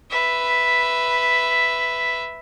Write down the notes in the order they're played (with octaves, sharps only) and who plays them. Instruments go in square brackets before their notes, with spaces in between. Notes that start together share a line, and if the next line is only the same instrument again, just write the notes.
[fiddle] B4 E5